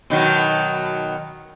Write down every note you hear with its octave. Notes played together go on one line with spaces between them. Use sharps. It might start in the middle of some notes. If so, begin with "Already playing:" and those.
B2 D#3 F#3